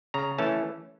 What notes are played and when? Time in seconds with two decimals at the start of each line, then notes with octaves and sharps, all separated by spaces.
0.14 C#3 A#5
0.38 E3 A3 C#4 A5